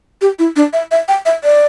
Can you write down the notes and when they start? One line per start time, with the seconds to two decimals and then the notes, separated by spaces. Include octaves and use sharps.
0.21 G4
0.39 E4
0.56 D4
0.73 E5
0.91 E5
1.08 G5
1.26 E5
1.44 D5